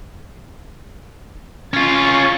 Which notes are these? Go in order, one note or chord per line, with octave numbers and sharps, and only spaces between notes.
C#4 F4 C#6 A6